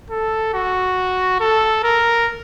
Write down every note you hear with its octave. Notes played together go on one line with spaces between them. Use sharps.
A4
F#4
A4
A#4